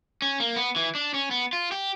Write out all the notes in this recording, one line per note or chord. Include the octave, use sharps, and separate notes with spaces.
C#4
A#3
B3
E3
D4
C#4
B3
F4
G4